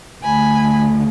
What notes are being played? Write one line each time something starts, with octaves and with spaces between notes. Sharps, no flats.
D2 D3 A3 G#5 B5